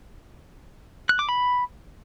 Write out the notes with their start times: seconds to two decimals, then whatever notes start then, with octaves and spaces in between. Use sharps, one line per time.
1.09 F#6
1.19 D6
1.29 B5